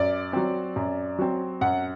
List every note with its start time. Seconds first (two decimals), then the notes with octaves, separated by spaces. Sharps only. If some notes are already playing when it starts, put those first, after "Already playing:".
Already playing: F#2 D5
0.33 F#3 C4
0.76 F#2
1.19 F#3 C4
1.61 F#2 F#5